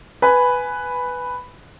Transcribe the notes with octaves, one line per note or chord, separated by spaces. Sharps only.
B4 G#5 B5